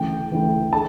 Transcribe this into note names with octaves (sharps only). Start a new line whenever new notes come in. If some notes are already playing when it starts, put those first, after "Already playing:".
Already playing: D2 C#3 E3 G5
D2 C#3 E3
D3 A5